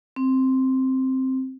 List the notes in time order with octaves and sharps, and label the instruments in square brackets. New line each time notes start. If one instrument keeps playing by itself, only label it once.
[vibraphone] C4